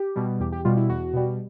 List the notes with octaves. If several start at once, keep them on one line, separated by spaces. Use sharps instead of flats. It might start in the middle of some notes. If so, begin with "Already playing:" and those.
Already playing: G4
B2 G3
E2 G4
G4
B2 G3 F4
E4
E2 F#4
B2 G3